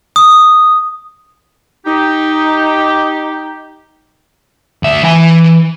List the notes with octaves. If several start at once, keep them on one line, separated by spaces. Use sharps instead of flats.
D#6
D#4 G4
D2 E5
E3 G#5